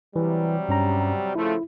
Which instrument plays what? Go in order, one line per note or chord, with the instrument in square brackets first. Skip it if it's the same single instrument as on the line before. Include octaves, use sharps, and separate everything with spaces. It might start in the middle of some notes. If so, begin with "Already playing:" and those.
[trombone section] C3 F#3 G3 [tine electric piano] E3
[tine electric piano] G2 C#4 A#5
[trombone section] C#3 F3 A3 [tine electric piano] E4